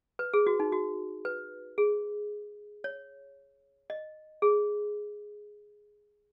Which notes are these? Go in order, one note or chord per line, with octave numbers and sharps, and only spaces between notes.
B4
G#4
F#4
D#4
F#4
B4
G#4
C#5
D#5
G#4